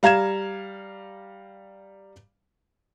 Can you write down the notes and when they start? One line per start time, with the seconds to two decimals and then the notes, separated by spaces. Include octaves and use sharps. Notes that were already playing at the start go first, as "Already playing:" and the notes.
0.03 G3 F5 A#5 G#6 E7